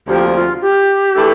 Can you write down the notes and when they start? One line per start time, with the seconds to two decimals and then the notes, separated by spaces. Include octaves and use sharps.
0.07 D2 C3 F3 A#3 G4
0.35 F4
0.62 G4
1.16 E3 A3 D4 A4